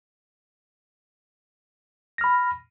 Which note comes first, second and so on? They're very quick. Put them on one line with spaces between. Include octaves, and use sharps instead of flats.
A#6 F6 B5